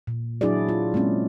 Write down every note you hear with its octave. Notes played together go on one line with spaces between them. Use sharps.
A#2
F#3 D4 E4 F#4 G#4 D5
F4
G#3 A#3 C4 C#4